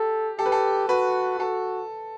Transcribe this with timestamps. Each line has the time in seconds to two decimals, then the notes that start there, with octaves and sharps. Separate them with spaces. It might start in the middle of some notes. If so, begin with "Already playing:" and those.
Already playing: G4 A4
0.38 G4 A4
0.46 B4
0.52 A4
0.89 F#4 B4
1.39 F#4 A4